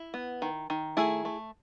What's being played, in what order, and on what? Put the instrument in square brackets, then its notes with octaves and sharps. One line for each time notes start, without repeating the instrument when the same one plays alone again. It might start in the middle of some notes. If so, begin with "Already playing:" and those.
Already playing: [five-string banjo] E4
B3
D#3
D#3
A3 E4 G#4
A3